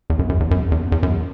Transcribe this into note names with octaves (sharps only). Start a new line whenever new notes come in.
E2
F#2
F#2
E2
F#2
E2
E2
F#2